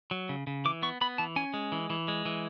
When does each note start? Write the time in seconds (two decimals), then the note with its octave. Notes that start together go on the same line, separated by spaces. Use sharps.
0.11 F#3
0.29 C#3
0.47 C#3
0.65 E3 D6
0.82 B3 C#6
1.01 B3 B5
1.18 E3 A5
1.36 C#4 G#5
1.54 G#3
1.72 E3
1.90 E3
2.08 G#3
2.25 E3